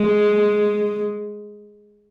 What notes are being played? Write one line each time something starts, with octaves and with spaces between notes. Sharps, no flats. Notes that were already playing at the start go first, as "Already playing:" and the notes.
Already playing: G#3